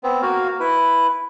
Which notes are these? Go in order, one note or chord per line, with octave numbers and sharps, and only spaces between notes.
B3 C4
A#3 F#4 F5
E4 B4